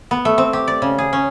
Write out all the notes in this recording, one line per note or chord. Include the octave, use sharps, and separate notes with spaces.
B3
A3
C4
G4
D5
C#3
G#4
C#4